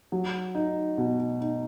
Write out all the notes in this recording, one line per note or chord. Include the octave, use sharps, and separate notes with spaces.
F#3
D#4
B2
D#4